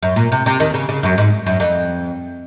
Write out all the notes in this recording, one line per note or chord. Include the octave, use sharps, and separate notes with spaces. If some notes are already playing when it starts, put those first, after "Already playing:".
F#2
A#2
C3
C3
D#2 D#3
C#3
C#3
F#2
G#2
F#2
F2